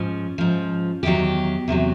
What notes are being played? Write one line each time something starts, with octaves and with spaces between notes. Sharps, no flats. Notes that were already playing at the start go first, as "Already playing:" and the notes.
Already playing: G#2 F3 C#4
G#2 F3
E2 C3 D#3 F#3 G4
E2 C3 D#3 F#3